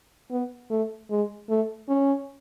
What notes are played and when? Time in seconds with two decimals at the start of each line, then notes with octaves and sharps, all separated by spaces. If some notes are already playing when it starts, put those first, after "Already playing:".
0.31 B3
0.70 A3
1.10 G#3
1.49 A3
1.89 C#4